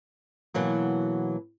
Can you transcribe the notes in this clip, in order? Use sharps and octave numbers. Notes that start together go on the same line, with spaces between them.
B2 E3 F#3 A#3